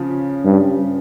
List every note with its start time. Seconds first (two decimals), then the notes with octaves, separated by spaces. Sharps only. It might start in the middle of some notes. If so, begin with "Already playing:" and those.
Already playing: C#3 F3
0.45 G2